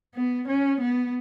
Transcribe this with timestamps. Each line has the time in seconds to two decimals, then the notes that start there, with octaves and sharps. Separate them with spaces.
0.15 B3
0.48 C#4
0.80 B3